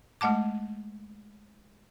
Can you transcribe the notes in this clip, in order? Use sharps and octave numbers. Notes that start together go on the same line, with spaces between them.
G#3 A3 F#5 A5 D6